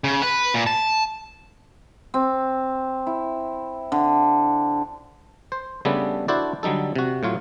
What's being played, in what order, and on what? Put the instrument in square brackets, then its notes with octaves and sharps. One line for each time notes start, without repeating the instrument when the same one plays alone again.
[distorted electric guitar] C#3
B4
A#2
A5
[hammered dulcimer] C4
E4
D3
[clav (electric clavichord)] C5
C#3 G3 A3 B3 D4 A4
D4 E4 F#4 A4 C5 D5
D3 F#3 G3 D#4 A4
C3 F#4
A2 F#3 F4 C#5